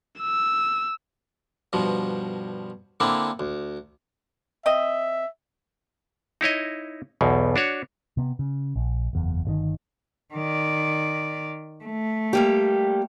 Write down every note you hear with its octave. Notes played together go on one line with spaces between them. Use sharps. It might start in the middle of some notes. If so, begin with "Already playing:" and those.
E6
G2 B2 F3
D3 A#3 C4 D4 E4
D2
C4 D#5 E5
D#4 E4 C#5 D#5
B1 E2 B2
D4 F#4 C#5
C3 B3
C#3
A#1
F#1 E2
G1 C3 D#3
D#3 D5
A3
G3 A#3 G4